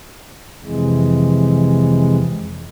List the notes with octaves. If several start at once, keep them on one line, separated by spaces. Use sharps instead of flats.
F2 C3 E3 G#3